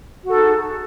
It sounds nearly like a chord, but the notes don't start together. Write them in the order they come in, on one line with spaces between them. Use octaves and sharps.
F#4 A4 D#4 G#4